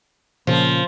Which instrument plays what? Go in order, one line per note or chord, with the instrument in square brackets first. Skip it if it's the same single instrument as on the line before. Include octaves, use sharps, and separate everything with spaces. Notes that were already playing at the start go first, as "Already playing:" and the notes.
[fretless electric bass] A#2 C#3 [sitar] F3